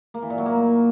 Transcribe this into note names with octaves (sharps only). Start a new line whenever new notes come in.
A#3
E3
A#2
F#3
A#3